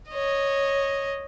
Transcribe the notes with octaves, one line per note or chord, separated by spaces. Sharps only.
C#5 D#5